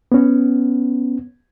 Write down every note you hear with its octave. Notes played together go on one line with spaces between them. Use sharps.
B3 C#4